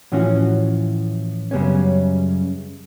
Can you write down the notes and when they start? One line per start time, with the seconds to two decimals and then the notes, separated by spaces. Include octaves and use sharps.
0.12 A2 E3 F3 C#4 F#4
1.51 F#2 C#3 G3 B3 C#4